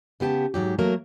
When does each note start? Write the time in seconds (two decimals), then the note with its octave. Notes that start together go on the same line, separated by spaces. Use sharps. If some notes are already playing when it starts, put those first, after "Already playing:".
0.20 C#3 B3 G4 G#5 A5
0.54 G#2 F#3 G4
0.79 F#3 A3 A#3 A#4